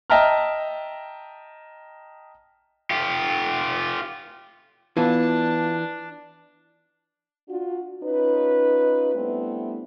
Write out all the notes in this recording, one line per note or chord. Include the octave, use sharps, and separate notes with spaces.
D#5 E5 G5 A5 A#5 F6
F4 G4
E3 B3 D4 F4 A5
D4 F4 F#4
C#4 D#4 F4 B4
G3 A3 B3 C4 D4 E4